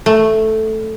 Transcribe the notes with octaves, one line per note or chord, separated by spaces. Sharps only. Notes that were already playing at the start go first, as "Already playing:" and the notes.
A3